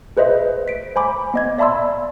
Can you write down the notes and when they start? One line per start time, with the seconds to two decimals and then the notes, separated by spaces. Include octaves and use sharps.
0.17 G#4 B4 C5 D#5 E5
0.68 B6 D7
0.96 C5 G#5 B5 D6
1.34 B3 D#5 G#6
1.58 D5 E5 A5 B5 C6 E6